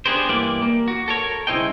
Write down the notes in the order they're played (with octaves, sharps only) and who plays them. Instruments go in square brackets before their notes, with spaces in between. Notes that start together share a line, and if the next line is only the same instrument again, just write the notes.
[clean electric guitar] B3 D4 G4 G#4 A#4 C5
G2 E3 A#3 G4 D5
A#3
F#4
A4 A#4 C#5
C2 C#3 E4 C5 D#5 G5